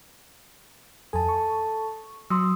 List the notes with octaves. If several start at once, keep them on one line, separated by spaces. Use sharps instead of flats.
F2 A4 G#5 A5
C#6
F#3 C6 D#6 E6